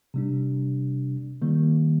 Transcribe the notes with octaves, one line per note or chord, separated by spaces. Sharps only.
C3 G3 D4
D#3 G3 A#3